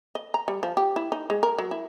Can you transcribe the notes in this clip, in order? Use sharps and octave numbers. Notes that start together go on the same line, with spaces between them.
D#5
A#5
G3
F3
G4
E4
D#4
G#3
A#4
F#3
E4